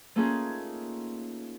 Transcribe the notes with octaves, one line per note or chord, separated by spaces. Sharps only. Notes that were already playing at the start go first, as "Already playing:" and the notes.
A3 A#3 C#4 D#4 F4 G#4